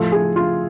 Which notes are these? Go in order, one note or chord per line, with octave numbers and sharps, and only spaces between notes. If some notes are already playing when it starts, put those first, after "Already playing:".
Already playing: A2 F3 A4
G#4
F4